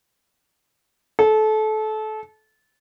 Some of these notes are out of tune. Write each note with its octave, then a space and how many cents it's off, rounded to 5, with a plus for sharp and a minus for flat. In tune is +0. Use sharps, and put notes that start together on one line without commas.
A4 -25